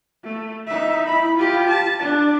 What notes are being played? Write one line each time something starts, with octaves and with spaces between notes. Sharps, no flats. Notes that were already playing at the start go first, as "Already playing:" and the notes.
A3
D#4 E5
E4 B5
F4 G4
A5
D4